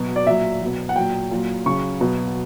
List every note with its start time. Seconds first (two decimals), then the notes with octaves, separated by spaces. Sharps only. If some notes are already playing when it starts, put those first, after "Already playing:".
Already playing: B2 F#3
0.16 D5
0.27 A#2 F#3 E5
0.62 B2 F#3
0.89 F#5
0.96 A#2 F#3 G5
1.31 A#2 F#3
1.66 C#3 F#3 C#6
2.01 B2 F#3